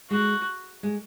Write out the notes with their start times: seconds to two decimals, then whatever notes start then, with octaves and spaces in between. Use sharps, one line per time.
0.10 G#3 F#4
0.83 G#3